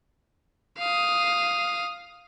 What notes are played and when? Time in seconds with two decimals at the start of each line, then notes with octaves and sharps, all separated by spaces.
0.79 F5 D#6